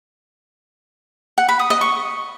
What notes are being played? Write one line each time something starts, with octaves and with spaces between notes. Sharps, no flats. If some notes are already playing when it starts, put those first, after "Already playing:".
F#5
B5
D#6
D#5
C#6